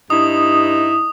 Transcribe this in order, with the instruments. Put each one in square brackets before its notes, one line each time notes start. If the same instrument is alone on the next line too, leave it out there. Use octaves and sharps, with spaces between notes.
[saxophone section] G2 D#4 E4 [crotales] D#6